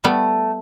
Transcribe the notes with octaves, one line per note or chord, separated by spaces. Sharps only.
G3 A3 B3